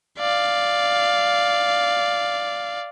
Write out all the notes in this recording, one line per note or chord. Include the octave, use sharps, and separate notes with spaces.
D5 F5